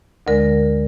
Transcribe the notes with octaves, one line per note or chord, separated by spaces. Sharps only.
D2 D3 G#3 A#4